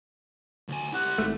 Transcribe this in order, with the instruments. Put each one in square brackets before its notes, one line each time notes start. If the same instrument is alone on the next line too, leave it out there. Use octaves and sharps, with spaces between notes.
[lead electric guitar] D2 G#5
[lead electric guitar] E4 G4 [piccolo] F#5
[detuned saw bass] G#1 [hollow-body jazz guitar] A3